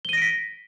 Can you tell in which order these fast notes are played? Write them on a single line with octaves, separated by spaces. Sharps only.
G7 D#7 A#6 D7 B6